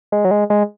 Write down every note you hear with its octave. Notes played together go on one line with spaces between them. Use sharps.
G#3
F#3
G#3
G#3